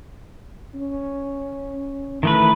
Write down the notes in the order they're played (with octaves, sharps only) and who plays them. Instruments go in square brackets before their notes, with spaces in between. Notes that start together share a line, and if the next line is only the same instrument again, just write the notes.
[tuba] C#4
[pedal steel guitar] D#3 A3 B4 [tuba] E3